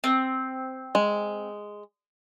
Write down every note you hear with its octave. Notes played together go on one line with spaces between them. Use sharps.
C4
G#3